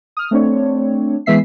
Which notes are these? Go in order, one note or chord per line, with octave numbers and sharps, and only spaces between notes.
D#6 F6
A3 C4 D4 C#5
E3 G#3 B3 E5 B6 C7